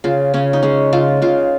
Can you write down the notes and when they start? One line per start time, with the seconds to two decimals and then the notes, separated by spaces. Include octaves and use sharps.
0.04 C#3 F4
0.34 C#3 C#4
0.53 D#4
0.63 G#3 C#4
0.93 C#3 F4
1.22 C#3 F4